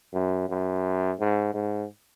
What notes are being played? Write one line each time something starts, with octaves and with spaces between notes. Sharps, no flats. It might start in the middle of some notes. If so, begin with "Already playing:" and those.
F#2
F#2
G#2
G#2